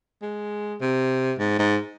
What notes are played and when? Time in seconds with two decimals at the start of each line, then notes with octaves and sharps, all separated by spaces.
0.22 G#3
0.81 C3
1.39 G#2
1.59 G#2